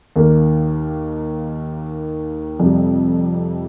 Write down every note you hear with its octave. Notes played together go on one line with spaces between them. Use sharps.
D#2 D#3 A#3
F2 C3 G3